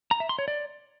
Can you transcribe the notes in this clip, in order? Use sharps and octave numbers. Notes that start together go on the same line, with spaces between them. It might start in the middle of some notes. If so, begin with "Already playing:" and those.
A#5
E5
C6
C#5
D5